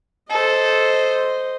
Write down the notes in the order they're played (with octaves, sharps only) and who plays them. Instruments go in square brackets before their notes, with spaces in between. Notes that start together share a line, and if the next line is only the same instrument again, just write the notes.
[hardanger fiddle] A4 [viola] C5 D#5